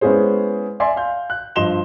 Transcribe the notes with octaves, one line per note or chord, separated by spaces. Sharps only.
G#3 B3 C#4 E4 G#4 C5
D5 E5 G#5 C6
F5 G6
F#6
G2 F3 D#5 C6 E7 G7